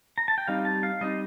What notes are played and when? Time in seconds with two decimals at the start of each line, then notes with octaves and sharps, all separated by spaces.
0.18 A#5
0.28 A5
0.38 G5
0.48 G3 C4 D#4 F5
0.65 A5
0.83 F5
1.01 G3 C4 D#4 D#5